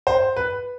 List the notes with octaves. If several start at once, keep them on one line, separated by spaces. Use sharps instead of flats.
C5
B4